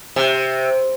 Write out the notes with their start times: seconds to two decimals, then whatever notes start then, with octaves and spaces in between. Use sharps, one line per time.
0.16 C3